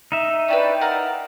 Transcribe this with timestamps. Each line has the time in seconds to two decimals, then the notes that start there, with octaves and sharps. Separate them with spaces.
0.12 D#4 E5
0.48 C#4 D4 E4 B4 D5 G5
0.81 A#4 F5 F#5